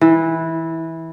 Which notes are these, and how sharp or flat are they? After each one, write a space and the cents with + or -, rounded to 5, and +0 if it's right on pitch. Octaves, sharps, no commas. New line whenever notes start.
E3 -15